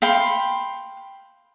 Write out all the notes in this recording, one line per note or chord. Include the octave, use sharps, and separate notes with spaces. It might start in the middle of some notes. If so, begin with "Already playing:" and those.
F5 G5 B5 C6